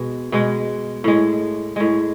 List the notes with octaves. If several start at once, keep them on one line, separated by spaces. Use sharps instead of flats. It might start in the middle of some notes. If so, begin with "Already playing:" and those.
Already playing: B2 G#3
B2 G#3
A2 G#3
A2 G#3